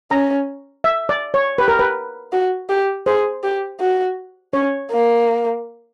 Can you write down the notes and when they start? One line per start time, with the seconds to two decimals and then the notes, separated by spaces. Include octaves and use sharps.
0.11 C#4 A#5
0.84 E5
1.09 D5
1.34 C#5
1.58 G4 B4
1.68 A#4
1.79 B4
2.32 F#4
2.69 G4
3.06 G#4 C5
3.43 G4
3.80 F#4
4.53 C#4 C#5
4.91 A#3